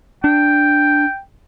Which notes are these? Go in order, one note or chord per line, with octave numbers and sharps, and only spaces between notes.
D4 G5